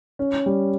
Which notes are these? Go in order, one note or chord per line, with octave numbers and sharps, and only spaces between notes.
C#4
G3